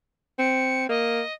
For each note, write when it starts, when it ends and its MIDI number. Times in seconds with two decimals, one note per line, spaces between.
0.39 0.86 60
0.39 0.87 97
0.89 1.21 58
0.89 1.34 75